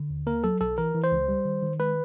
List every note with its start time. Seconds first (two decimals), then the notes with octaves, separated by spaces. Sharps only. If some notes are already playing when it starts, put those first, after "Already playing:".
Already playing: D3
0.10 D#2
0.27 A#3 A#4
0.44 F#3 A4
0.61 B1 A4
0.78 E3 A#4
0.94 E3
1.04 C5
1.12 C#2
1.28 G3
1.45 D#3
1.62 D#3
1.79 G#3 B4